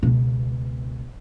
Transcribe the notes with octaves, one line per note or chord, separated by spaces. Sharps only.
C#2 B2